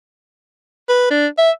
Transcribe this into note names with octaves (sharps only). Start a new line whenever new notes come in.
B4
D4
E5